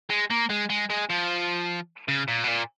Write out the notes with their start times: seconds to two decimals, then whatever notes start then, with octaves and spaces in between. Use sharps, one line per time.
0.10 G#3
0.30 A#3
0.50 G#3
0.70 G#3
0.90 G#3
1.10 F3
2.08 C#3
2.28 A#2
2.44 B2
2.48 A#2